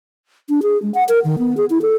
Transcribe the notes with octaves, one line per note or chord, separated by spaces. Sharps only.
D4
G#4
G#3
F#5
A#4
D#3
B3
G#4
E4
A4